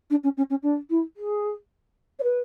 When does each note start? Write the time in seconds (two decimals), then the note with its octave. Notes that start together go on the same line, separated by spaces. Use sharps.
0.10 D4
0.24 C#4
0.37 C#4
0.50 C#4
0.63 D4
0.90 E4
1.17 G#4
2.19 C#5
2.23 B4